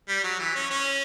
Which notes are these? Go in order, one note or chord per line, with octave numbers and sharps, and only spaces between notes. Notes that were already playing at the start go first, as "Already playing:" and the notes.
G3
F#3
E3
C#4
C#4